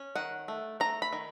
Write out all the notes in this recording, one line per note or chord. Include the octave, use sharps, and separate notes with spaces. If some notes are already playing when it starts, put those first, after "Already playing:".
Already playing: C#4
D#3 F#5
A3
A3 A#5
B5
D#3